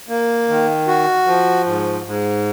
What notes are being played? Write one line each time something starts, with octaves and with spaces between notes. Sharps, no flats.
A#3
D#3
F#4
F3
G#2
G#2